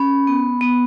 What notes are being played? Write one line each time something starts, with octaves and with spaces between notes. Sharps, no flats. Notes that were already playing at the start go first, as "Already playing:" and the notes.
Already playing: C#4 B5
B3
B3